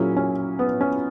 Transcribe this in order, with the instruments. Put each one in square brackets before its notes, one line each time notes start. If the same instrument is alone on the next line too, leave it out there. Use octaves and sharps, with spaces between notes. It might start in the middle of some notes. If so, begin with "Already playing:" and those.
Already playing: [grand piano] A#2 F#3 A#3 E4 G#4 [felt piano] C#4
[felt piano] C#4
B3
C#4